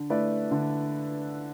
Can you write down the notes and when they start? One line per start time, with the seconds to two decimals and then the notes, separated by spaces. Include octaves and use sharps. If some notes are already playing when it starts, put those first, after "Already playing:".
Already playing: D3
0.10 A3 E4 B4 D5
0.51 D3